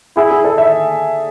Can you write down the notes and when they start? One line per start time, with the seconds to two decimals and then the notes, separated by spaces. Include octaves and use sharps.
0.16 E4 G#4
0.31 G#4
0.44 A4
0.58 E5